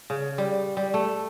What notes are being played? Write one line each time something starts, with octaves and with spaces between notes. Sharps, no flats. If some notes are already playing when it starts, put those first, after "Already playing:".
C#3
G3
G3
A3